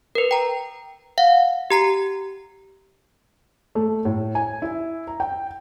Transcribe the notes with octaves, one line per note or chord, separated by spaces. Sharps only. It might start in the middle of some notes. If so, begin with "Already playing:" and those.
A#4 B4
G5 A#5
F5 F#5
G4 A#5 C7
A3
A2
G#5
E4
A#5
G5